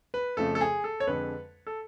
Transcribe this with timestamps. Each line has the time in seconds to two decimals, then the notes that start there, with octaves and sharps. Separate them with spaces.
0.14 B4
0.37 F2 C#3 F3 A3 A4
0.55 A4
0.61 G#4
0.84 A4
1.00 C#5
1.07 F2 D3 G#3 B4
1.67 A4